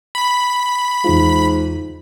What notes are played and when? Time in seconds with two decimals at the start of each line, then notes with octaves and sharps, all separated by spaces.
0.15 B5
1.04 E2 G#2 F4